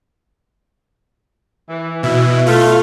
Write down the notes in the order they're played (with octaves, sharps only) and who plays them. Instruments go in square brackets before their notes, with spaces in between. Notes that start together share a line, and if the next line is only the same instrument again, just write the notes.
[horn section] E3
[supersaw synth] B2 [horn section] E4
[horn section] A3 [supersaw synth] F4 F6